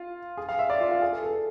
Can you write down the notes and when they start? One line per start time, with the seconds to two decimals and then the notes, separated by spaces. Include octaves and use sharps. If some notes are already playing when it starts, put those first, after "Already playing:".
Already playing: F4
0.37 G#4
0.49 F5
0.59 E5
0.70 D5
0.80 F4
0.91 F4
1.02 G#4
1.13 A4
1.24 A4